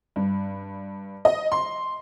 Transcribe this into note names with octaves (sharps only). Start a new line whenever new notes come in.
G2
D#5
C6